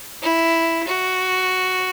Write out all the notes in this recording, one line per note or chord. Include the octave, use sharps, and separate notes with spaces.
E4
F#4